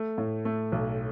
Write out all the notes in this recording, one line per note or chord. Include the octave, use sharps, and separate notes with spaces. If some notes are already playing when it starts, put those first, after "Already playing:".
Already playing: A3
A2
A3
B1